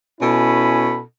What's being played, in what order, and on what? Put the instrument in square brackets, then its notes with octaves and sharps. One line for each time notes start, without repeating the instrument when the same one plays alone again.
[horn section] B2 C#4 E4 A4 G#5 B5